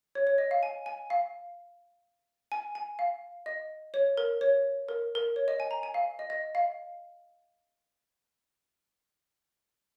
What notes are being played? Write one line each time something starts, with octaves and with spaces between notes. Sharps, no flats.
C#5
C#5
D#5
F5
G#5
G#5
F5
G#5
G#5
F5
D#5
C#5
A#4
C#5
A#4
A#4
C#5
D#5
G#5
A#5
G#5
F5
D#5
D#5
F5